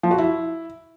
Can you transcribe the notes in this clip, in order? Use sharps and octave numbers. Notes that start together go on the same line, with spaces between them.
F3
F#4
E4